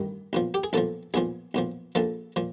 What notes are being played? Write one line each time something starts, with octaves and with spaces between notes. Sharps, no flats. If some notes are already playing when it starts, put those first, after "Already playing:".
Already playing: A1 G2 D#3
B1 A#2 F3
G4
G#4
B1 A#2 F3 A4
B1 A#2 F3 G#4
B1 A#2 F3
A#1 A#2 F3 A4
A#2 F3